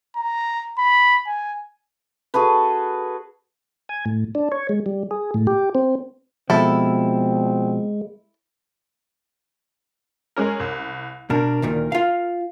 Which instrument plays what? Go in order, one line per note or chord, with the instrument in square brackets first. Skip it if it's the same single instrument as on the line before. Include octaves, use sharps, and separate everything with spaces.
[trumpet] A#5
B5
G#5
[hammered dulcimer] F#4 G#4 A4 B4
[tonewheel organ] G#5
A2
D4
C#5
G#3
G3
G#4
A2
G4
C4
[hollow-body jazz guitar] B2 F3 [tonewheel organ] G#3 [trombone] C4 [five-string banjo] E4 A4
[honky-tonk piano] G#3 C#4 A#4
C2
[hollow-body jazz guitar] B2 D4 [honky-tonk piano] A#4
[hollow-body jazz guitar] D2 A#2 D#3
F4 F5